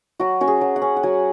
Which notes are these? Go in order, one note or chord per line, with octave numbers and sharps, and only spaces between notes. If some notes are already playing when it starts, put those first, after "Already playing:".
F#3 F#4
C#4 F#4
G#4
F#3
F#5
C#4
F#5
F#3 G#5